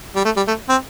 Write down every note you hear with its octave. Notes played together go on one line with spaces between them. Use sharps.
G3
A3
G3
A3
C4